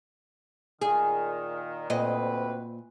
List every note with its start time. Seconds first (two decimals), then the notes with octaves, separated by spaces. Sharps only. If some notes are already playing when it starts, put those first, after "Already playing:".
0.82 A#2 D#3 G#4
1.90 D2 A#2 C4 B4 D#5